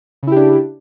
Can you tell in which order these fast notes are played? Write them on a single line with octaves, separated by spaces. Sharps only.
C#3 E4 G4 D4